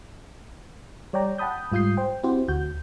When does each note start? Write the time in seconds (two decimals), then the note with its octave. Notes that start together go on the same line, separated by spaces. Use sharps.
1.13 G3 C#5 D5 G5 A#5
1.38 F#5 G5 A5 B5 D#6 G6
1.72 G#2 G3 F4 D#6 G6 C7
1.97 C5 G5
2.23 C4 E4 F#4 G4 C5
2.48 D2 F#4 G6